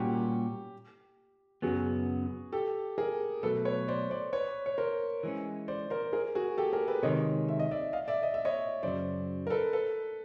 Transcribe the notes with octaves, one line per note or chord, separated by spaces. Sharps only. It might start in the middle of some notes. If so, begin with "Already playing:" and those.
Already playing: A#2 G3 A#3 C#4 F#4 G4
F#2 C#3 F#3 B3 F#4 G#4
G4 A4
G#4 A#4
B2 F#3 A3 A4 B4
B4 C#5
C5 D5
C5 D5
B4 C#5
C#5
A#4 C5
E3 G#3 C#4
C5 D5
A#4 C5
G#4 A#4
F#4 G#4
G4 A4
G#4 A#4
A4 B4
C3 D#3 G#3 C#5 D#5
E5
D#5
D5 E5
D#5 F5
D5 E5
D#5
E5
C#5 D#5
F#2 C#3 F#3 C5 D5
A#4
A4 B4
A4 B4